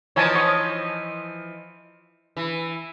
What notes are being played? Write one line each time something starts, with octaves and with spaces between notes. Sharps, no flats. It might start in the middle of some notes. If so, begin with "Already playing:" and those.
E3 F3 D#4 C#5 G#5 A5
C#5 D#6
E3